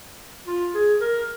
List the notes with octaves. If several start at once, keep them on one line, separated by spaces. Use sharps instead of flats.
F4
G#4
A#4